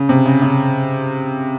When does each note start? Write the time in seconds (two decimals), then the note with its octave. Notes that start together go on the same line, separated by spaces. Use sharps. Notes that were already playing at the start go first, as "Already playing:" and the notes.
Already playing: C#3
0.09 C3
0.25 C#3
0.42 C#3